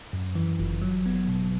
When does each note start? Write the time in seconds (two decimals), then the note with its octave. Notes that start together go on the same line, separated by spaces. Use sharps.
0.13 F#2
0.35 E3
0.59 G1
0.82 F#3
1.06 B3
1.28 B2